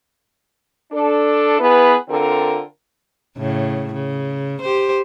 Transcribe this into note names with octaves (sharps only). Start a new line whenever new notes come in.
D4 A4
B3 E4 G#4 B4
D3 C4 F4 A4 A#4
A2 C#3
C#3
G4 C5